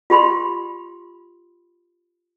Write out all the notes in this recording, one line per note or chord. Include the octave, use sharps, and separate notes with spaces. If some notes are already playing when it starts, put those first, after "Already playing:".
F4 G4 B5 C6